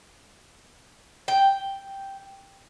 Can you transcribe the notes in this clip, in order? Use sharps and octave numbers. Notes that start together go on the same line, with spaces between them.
G5